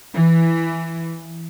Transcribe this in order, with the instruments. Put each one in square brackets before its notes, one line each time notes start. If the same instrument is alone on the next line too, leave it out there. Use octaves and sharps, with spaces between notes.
[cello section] E3